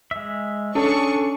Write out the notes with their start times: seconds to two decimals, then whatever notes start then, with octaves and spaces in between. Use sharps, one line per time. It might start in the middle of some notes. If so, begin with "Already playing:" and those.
0.11 G#3 E5
0.75 C#4 D4 G#4 A4 C#6